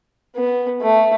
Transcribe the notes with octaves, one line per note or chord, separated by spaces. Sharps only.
B3
A3